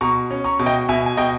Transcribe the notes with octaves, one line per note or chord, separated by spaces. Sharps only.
B2 A#5 C#6
C#4
A#5 C#6
B2
D#5 G5
B2 E5 G#5
G#5
B2 D#5 G5